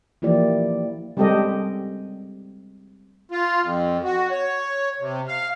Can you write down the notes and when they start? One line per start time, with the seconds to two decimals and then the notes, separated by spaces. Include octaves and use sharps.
0.22 E3 F3 A#3 E4 G4 D5
1.17 G3 G#3 C4 G4 A4 D#5
3.31 F4
3.62 F2
4.04 F#4
4.31 C#5
5.00 C3
5.28 F5